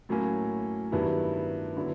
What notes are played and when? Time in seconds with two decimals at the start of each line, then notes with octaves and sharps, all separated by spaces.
0.09 A2 F#3 A#3 C#4
0.92 G2 D#3 F#3 B3 E4
1.76 D3 F#3 B3 E4